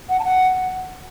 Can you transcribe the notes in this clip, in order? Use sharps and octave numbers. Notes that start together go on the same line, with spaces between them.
F#5
A5
F#5